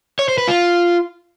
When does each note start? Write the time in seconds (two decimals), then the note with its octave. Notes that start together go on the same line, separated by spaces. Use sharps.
0.19 C#5
0.28 C5
0.38 B4
0.47 F4